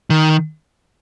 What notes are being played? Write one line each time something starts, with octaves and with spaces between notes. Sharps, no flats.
D#3